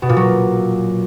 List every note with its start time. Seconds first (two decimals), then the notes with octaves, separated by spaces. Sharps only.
0.02 B2
0.09 A#2
0.16 F#3